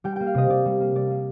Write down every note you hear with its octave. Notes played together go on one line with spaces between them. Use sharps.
G3 G5
A#3 G5
F5
C3 D#5
C3 D5
G3
A#3
G3 D5
A#3